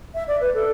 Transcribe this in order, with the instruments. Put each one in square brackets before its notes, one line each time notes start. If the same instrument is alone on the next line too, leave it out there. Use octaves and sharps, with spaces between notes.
[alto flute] E5
D5
B4
A4